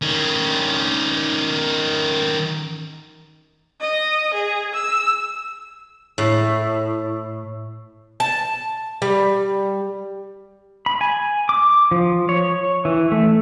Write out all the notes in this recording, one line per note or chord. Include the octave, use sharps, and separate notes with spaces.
D#3 C#4
D#5
G#4
E6
A2
A5
G3
B5
G#5
D6
F3
C#5
E3
A3